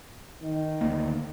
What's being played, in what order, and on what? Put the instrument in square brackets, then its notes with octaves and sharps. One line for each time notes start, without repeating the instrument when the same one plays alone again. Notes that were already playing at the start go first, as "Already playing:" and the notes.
[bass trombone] D#3
[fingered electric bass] D2 A#3